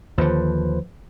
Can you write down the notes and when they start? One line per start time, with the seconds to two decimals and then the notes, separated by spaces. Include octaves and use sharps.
0.18 D#2 D3 F3 B4 C5